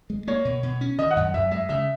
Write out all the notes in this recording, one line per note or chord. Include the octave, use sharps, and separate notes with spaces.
G#3
A#3 C#5
B2
B2
C#4
D#3 D#5
F#5
F#2
F#2 E5
G#3 E5
C#3 E5